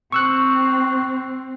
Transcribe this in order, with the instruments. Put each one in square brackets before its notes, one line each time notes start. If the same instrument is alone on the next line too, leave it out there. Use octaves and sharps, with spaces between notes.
[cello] C4 [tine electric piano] C#6 E6 F#6